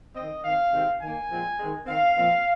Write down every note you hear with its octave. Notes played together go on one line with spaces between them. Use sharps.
D#3 C4 D#5
D#3 C4 F5
C3 D#3 G#3 C4
D#3 A#3 G#5
A#2 F3 G#3 C4
D#3 G#3 C4
D#3 C4 F5
A#2 F3 C4